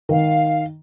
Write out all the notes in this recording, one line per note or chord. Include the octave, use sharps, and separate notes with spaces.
D#3 F5